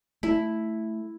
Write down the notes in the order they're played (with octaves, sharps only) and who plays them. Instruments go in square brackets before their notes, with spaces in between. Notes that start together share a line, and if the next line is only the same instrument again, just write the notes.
[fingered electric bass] A3 [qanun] E4